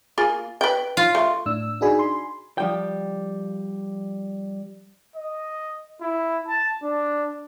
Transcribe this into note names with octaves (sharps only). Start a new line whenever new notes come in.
A#3 F4 G#4
B4 G5
F4
A3
A2 D4 E6
D4 D#4 F#4 G#4 G#5 B5
C6
F3 G3 G5
D#5
E4
A5
D4